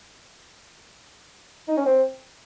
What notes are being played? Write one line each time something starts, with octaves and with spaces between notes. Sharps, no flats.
D#4
C#4
C4